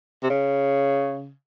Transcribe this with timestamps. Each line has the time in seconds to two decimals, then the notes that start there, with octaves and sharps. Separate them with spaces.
0.23 C3
0.30 C#3